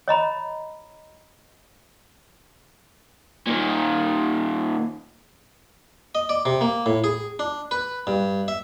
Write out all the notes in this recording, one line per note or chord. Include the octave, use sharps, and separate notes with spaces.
C#5 D#5 A#5 B5
A#2 D#3
D#5
D5
C3
A#3
A2
G#4
D4
B4
G2
E5